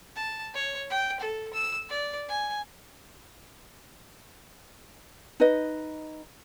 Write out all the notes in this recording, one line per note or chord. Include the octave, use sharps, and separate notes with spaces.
A5
C#5
G5
A4
E6
D5
G#5
D#4 B4 D#5